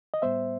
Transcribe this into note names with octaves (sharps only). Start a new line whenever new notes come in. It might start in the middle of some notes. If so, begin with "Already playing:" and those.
D#5
A2 G3 B3 C5 E5